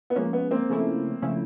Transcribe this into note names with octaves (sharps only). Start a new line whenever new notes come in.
B3
F3 G#3 A#3 C#4
B3
A#3 C4
C#3 F3 A3 C#4 E4
C#3 F3 A3 C#4 E4